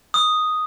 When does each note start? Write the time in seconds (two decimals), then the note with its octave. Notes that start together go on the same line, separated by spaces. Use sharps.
0.14 D#6